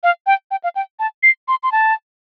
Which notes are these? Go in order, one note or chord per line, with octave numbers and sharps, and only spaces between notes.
F5
G5
G5
F5
G5
A5
C7
C6
C6
A5